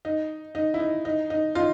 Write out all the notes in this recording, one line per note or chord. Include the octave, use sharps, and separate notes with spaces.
D#4
D#4
E4
D#4
D#4
D#4
D#4 F4